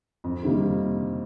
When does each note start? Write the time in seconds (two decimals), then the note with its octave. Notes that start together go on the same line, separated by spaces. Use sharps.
0.24 F2
0.43 C3 D#3 G3 A#3